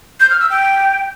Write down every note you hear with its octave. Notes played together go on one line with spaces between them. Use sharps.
G6
F6
E6
G5